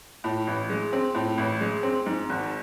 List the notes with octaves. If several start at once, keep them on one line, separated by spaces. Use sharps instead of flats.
A2
A1
G#3
C4
A2
A1
G#3
C4
G#2
G#1